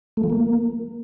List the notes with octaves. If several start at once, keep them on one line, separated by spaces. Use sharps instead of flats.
A3
F3
A#3